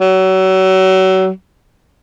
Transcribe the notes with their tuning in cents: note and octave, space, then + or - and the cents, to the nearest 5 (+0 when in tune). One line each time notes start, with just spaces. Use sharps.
F#3 +30